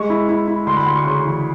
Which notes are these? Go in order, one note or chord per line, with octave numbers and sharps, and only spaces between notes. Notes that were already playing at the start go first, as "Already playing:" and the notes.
Already playing: G#3 C#6
E4
E4
E4
D2 C6
B5
D2 C6
C#6
C#3 C6
E3